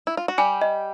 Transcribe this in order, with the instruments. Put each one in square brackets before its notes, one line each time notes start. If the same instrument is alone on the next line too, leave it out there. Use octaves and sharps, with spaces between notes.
[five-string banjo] E4
F4
F#4
[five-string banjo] G3 G4 [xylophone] G#5
[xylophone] D#5